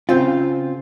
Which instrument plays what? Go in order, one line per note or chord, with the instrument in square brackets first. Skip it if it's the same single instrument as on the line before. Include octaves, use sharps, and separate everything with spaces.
[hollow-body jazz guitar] C#3 C4 F4